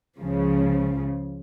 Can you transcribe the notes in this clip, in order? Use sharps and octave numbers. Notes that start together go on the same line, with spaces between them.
C#2 C#3 F3